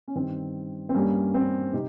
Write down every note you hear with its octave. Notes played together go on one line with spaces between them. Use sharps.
C#4
G2 D#3 G3 C4
C4
G2 G3 A#3 C#4
C4
C3 D#4 G4